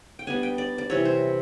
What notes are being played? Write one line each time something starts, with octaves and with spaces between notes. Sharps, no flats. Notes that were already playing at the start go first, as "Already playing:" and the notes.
G5
G3 B3 D4 G#5
G5
D5
D5
C3 E3 G3 C#5
C5